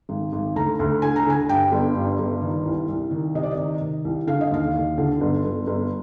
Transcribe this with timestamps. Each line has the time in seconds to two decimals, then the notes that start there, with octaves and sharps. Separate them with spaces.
0.09 G#1
0.32 G#1
0.56 D2 A#5
0.79 D2
1.02 D3 G#5
1.16 A#5
1.26 D3 G#5
1.49 G2 G5
1.72 G1
1.95 G2
2.19 G1
2.41 D#3
2.66 C2
2.89 C2
3.11 D#3
3.35 C3 D#5
3.43 D5
3.51 D#5
3.57 D#3
3.81 D#3
4.05 C2
4.27 D3 F5
4.41 D#5
4.51 D#2 F5
4.74 D#2
4.98 D3
5.21 G1
5.44 G1
5.67 G1